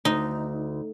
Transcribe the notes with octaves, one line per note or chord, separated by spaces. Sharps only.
D2 D#4